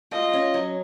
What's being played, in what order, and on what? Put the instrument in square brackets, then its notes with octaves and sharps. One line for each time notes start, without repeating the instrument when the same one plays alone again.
[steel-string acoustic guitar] F4 [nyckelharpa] D#5
[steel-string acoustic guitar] C#4
F#3